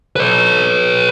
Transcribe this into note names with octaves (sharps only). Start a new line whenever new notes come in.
B4 C#5